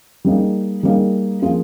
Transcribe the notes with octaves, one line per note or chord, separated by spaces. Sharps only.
G3 A#3 D#4 G#4
G3 A#3 D#4 G#4
F3 A#3 F4 G#4